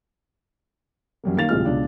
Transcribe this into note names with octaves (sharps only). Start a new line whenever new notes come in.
F#2 F#3 G3 A#3
D#3 A#3 F5 A6 F7
D1 C3 G#3 F4 F6
C#2 B2 D4